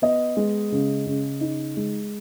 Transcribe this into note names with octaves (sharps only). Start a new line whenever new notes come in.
B3 D#5
G#3
C#3
C#3
D#4
G#3